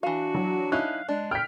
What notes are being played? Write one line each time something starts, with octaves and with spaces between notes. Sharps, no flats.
E3 D4 F#4 F5
F#3
C#4 D#4 E4 F5 F#6
G#3 D4
G5 F6 B6